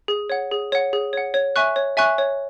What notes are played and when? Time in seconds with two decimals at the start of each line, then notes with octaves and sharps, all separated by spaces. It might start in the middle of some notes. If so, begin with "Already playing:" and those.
0.08 G#4
0.30 C#5 F#5
0.51 G#4
0.72 C#5 F#5
0.93 G#4
1.13 C#5 F#5
1.34 C#5
1.56 E5 G#5 C#6 F#6
1.76 C#5
1.97 E5 G#5 C#6 F#6
2.18 C#5